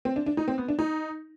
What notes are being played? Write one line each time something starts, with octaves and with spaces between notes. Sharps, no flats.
C4
D4
D4
D#4
C4
B3
D4
D#4